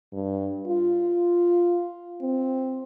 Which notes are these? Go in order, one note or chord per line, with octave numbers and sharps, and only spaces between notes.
G2
F4
C4